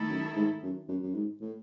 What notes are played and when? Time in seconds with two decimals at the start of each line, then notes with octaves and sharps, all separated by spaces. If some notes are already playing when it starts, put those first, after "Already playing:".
Already playing: D#3 A3 E4 A4
0.10 F#2
0.36 G#2
0.62 F#2
0.88 F#2
1.03 F#2
1.14 G#2
1.41 A2